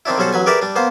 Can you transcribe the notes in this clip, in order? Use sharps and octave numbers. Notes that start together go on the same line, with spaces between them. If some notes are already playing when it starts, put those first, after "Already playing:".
D#3 C4 D4 E4
B1 G3 C#4 A4 C5 F#5
A1 F#3 B4 G#5
G4 G#4 A#4 B4 D5 E5
G3 D4
A#3 B3 C5